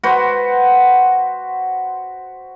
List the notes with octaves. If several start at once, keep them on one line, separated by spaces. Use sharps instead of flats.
F#4 B4 C5